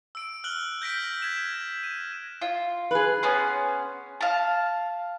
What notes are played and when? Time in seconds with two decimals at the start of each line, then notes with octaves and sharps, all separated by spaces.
0.15 E6 D7
0.44 F6 F#6 F#7 G7
0.82 G6 A#6 B6 D7
1.22 G#6 E7
1.83 D#7
2.42 F4
2.91 G#4 B4
3.23 B3 C#4 C6
4.21 F5 A5